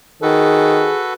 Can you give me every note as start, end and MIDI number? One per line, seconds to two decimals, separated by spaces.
0.22 0.88 51
0.22 1.14 66
0.22 1.05 68
0.22 1.14 69
0.22 1.14 71